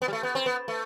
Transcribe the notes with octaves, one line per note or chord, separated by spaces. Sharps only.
B3
G3
A3
B3
C4
B3
A3